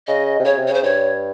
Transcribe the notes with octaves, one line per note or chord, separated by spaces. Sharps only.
C#3 D#5
C3
C#3 C#5
C3
C#5
C#3 C5
G2 C#5